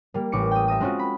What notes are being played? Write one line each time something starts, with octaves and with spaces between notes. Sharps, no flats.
G3 A#3
A1 D6 C#7
G5 D#6
E5 A#5 D#6
G#3 C4 C#4 F4 F#4
B5